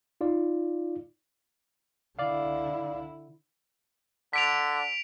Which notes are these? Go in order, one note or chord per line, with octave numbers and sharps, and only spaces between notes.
D#4 F4 D5
D3 E4 D5 F5
D3 B6 D7 F7